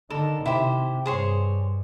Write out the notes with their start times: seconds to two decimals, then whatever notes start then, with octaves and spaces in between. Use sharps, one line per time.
0.10 D3 D#3 A4 A#4
0.46 C3 E4 G4 C5
1.06 G2 G#4 C5 C#5